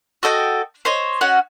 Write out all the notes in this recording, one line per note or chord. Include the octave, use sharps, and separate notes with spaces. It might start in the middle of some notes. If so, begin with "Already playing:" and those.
F#4 A4 D#5 G5
C5 C#5 D#5
C#4 F#4 D#5 F#5